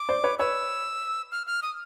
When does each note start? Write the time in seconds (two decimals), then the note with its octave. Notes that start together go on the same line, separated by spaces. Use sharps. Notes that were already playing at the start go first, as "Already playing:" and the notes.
Already playing: D6
0.09 C5 D5
0.24 B4 C#5
0.39 B4 C#5 E6
1.32 F6
1.47 F6
1.63 D#6